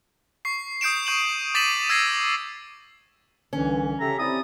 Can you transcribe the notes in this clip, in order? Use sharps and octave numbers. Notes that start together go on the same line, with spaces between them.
C#6 C7
D#6 G6 C7 D7 E7
C#6 G6 D#7 F#7
D6 A6 B6 D#7 E7 F#7
E6 G#6 A#6 C7
C2 D3 E3 C#4
C#3 G4 A4 E5 A#5
C4 E4 G4 D5 D#6